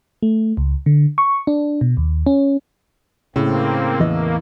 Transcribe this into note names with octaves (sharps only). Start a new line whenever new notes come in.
A3
C#2
D3
C#6
D4
B2
D#2
C#4
A2 C#3 A#3 C4
E2 E3 A#3 D#5